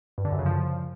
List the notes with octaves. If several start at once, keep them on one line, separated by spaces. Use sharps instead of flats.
G2
D3
F#2
C#3
F3